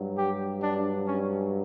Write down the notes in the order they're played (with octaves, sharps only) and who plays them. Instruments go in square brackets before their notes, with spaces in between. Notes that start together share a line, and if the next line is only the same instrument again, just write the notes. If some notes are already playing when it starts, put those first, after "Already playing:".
Already playing: [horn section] G2 F#3
G4
D4
C#4